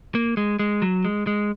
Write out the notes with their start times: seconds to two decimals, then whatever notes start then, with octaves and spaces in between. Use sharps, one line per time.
0.15 A#3
0.37 G#3
0.59 G#3
0.82 F#3
1.05 G#3
1.27 G#3